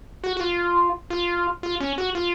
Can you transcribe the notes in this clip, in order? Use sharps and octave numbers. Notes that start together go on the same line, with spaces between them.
F#4
F#4
F4
F4
F4
C#4
F#4
F4